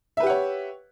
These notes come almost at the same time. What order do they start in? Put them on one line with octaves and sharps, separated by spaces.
E5 B4 G4 F#5 C#5